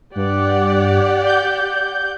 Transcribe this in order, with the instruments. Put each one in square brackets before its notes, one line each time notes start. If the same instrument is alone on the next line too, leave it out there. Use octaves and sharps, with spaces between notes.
[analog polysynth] G2 [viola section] G4 D5 F#5
[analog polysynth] G6